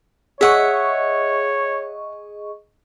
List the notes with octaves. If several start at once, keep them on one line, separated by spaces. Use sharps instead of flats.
G#4 C#5 D#5 E5 F#5 C#6